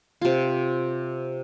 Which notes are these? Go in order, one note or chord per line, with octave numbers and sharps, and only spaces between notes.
C3 F4